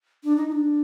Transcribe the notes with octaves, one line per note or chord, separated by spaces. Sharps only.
D4
D#4
D#4
D4